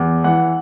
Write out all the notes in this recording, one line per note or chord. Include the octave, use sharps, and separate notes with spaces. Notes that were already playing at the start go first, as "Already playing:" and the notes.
Already playing: E2
E3 F#5